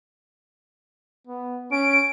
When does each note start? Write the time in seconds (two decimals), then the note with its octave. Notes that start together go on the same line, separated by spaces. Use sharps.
1.27 B3
1.72 C#4 D7